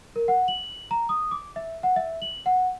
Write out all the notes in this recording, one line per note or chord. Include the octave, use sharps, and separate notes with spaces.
A#4
F#5
F#7
A#5
D#6
D6
E5
F#5
E5
F#7
F#5